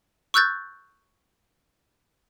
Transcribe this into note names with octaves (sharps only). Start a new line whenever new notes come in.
C#6 E6 F#6 G6 A6